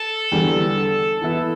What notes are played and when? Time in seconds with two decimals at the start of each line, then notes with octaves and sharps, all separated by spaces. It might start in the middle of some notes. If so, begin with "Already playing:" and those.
Already playing: A4
0.32 E2 D3 G3
1.21 E3 B3 E4